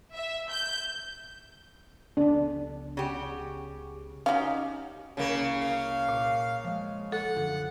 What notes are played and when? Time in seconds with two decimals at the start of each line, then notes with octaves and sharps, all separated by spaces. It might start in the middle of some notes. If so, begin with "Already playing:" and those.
0.14 E5
0.50 G6
2.17 C#2 B3 D4
2.97 C#3 G4 F#5
4.26 C#4 D#4 F#4 G4 F5
5.17 C2 C#3 A#3
5.61 F5
6.09 A#2
6.64 F3 G#3
7.12 A4 F#5
7.36 F#2 D3 F3